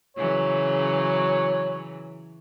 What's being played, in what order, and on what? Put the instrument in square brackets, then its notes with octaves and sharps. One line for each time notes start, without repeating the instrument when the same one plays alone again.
[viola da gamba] C#3 E3 F#3 [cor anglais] C#5